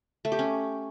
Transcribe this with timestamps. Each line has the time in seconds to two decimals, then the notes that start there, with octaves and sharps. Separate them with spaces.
0.25 A3
0.32 G4
0.39 C#4